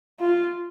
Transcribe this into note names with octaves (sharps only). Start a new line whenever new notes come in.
F4